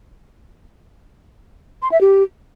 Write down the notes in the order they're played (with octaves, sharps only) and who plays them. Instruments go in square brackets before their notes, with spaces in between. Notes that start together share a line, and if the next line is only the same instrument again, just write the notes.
[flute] C6
E5
G4